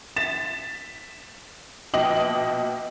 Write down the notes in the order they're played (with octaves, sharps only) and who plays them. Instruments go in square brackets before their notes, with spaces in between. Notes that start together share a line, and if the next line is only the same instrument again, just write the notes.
[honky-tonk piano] A6 B6 E7
A#1 B2 D#5 G5 D6 F#7